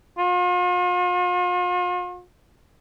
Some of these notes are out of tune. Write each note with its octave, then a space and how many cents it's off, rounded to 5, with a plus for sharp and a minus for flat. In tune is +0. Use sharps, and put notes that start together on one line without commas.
F4 +45